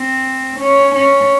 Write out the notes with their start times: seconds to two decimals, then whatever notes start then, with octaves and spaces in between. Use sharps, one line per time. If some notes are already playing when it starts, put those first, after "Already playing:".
Already playing: C4
0.60 C#4
0.95 C#4